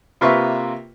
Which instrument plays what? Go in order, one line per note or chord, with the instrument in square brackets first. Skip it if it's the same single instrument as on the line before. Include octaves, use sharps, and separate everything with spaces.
[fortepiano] C3 A#3 F4 B4 E5 C#6